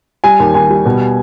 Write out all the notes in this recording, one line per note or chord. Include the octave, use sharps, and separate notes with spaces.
G3 G#5
D#2
D#2 G#5
G3
B2